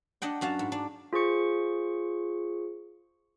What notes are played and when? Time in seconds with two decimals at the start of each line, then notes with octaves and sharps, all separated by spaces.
0.22 D4 D#5 F#5 G5
0.41 F#2 F#4 F5 A5
0.59 G#2
0.72 D4
1.13 F4 G#4 C5 C#6 C#7